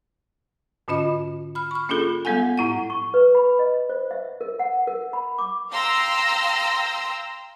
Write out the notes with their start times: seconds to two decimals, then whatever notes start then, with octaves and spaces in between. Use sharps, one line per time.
0.88 G#2 D3 C#4 F4 D#5
1.55 B5 F6
1.71 C#6 F6
1.89 A#3 C#4 D4 F4 G#4 A4
2.25 G3 G#3 B3 A4 F#5 G#5
2.58 A2 E4 F#5
2.90 C#6
3.14 B4
3.35 B5
3.59 D#5
3.90 C5
4.11 E5
4.41 A#4
4.59 F#5
4.87 A#4
5.13 B5
5.38 D6
5.71 F5 G5 A#5 C6 E6 A#6